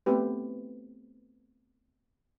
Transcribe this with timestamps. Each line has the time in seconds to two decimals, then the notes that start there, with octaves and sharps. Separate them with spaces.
0.06 A3 B3 C4 G4 B4